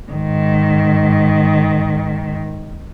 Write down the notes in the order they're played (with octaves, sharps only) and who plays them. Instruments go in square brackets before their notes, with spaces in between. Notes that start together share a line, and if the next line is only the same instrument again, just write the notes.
[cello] G#2 D#3